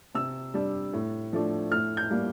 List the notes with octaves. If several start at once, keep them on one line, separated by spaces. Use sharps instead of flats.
C3 E6
G3 D4
A2
F3 A3 D4
A2 F6
G6
G3 A#3